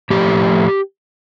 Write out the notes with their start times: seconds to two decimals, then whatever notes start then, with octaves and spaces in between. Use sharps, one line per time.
0.10 A2 F3 A3 G4